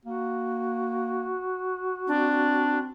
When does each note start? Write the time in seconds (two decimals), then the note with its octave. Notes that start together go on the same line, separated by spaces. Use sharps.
0.05 A#3 F#4
2.08 C4 D4